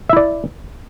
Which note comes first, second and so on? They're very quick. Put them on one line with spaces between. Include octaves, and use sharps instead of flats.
E5 E4 D5